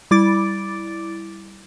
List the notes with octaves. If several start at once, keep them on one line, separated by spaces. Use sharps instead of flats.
G3 E4 D6 A6 D7